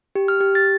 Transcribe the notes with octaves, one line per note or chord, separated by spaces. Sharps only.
G4
F6
G4
A6